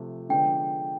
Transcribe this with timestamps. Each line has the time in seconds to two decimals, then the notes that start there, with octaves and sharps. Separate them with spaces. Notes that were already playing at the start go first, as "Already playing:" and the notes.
Already playing: C3 F3 A3
0.29 D3 F3 G#3 B3 D4 G5